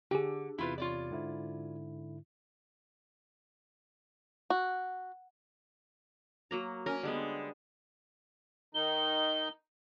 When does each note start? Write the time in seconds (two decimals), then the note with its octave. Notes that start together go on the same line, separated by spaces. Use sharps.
0.11 D3 G4 G#4
0.58 E2 C3 E4 F4 B4
0.78 F4 C#5 D5
1.11 G#2 D3 E4
4.50 F#4
6.51 F#3 A#3 A#5
6.86 C#4 A#4
7.03 D3 G3 G#3 B3
8.75 D#3 D#4 G7